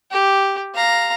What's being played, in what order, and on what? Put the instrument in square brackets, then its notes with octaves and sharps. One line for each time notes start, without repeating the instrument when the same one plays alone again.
[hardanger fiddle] G4
F5 A#5